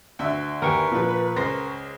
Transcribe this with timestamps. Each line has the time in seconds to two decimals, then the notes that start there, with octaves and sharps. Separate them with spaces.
0.19 D2 E5 E6
0.62 D#2 A#4 B4 G5 G#5 C#6
0.92 A#2 F3
1.36 C#2 C5 A#6